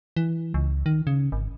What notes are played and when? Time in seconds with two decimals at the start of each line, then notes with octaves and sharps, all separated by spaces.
0.17 E3
0.54 C#2
0.86 D#3
1.07 C#3
1.32 G#1